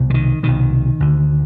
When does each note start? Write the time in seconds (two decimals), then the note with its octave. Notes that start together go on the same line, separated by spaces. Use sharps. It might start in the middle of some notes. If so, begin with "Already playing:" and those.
Already playing: C2 B2
0.10 D3
0.14 D#3
0.43 C2 B2 D#3
1.00 D2 D3